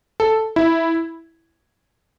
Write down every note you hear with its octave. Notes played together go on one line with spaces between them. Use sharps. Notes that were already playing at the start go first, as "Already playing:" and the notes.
A4
E4